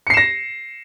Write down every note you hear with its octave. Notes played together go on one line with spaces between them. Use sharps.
A#6 C7 C#7 E7